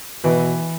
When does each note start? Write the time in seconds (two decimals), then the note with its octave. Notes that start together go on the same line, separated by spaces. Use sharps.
0.24 B2 E3